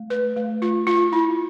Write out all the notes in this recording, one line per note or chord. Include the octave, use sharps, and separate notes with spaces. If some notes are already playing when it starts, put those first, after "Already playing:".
Already playing: A3
B4
A3
F4
F4
E4